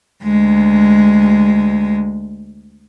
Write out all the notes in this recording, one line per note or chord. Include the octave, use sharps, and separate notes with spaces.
D2 G#3